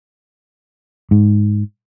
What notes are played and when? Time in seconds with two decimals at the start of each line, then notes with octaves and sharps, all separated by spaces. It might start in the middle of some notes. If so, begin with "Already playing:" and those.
1.11 G#2